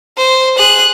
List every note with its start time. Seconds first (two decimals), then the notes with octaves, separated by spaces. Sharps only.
0.17 C5
0.58 G#4 F#6